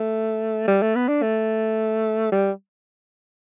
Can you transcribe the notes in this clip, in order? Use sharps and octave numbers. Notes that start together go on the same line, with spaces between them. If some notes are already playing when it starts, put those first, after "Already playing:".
Already playing: A3
G3
A3
B3
D4
A3
G3